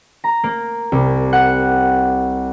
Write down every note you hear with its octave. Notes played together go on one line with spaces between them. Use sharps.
A#5
A#3
C2
F#5